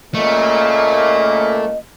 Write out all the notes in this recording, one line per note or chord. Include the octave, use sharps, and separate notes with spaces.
A#2 C#3 A3 A#3 D#5